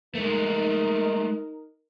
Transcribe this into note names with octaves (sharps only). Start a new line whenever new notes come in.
G#3 A3 D#4 A#4